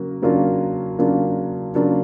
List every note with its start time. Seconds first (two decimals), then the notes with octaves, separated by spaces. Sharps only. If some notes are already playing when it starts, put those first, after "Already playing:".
Already playing: C#3 F#3 A#3
0.22 C#3 F#3 A#3 D4 F4
0.99 C#3 F#3 A#3 D4 F4
1.75 C#3 F#3 A#3 D4 F4